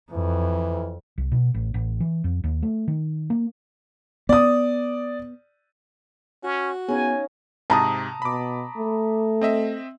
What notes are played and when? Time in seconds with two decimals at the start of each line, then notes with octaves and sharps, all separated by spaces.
0.12 F2 E3
1.18 C2
1.32 B2
1.54 A1
1.74 A1
2.00 E3
2.24 F2
2.44 D#2
2.62 A3
2.88 D#3
3.30 A#3
4.29 B3 D5 D#6
6.44 C#4 F#4
6.88 B3 C#4 D#4 G#4 F5 G#5
7.70 G#2 C3 A5 A#5 D#6
8.22 B2 B5 D6
8.77 A3
9.41 C4 D#5 E5